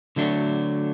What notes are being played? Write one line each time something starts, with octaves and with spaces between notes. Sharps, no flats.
D3 F#3 A3 D4